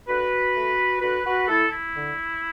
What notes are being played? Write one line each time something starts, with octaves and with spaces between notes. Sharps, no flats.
D3 F#4 B4
A3
D3 F#4 B4
F#4 B4
A3 E4 A4
E4
D3